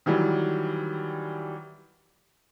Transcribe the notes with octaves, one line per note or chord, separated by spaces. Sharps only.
D#3 E3 F#3 G3